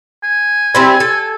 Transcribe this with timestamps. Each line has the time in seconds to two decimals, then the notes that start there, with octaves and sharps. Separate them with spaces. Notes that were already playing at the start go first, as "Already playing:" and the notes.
0.24 G#5
0.75 G3 C4 E4
1.00 A4